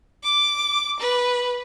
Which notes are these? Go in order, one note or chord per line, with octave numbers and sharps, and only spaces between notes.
D6
B4